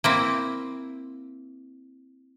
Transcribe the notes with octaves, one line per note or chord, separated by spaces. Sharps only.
A#3 C4 E4